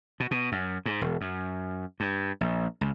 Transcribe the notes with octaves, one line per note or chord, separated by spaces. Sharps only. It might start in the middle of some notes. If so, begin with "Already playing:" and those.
B2
B2
F#2
G#2
E1
F#2
G2
A#1
C#2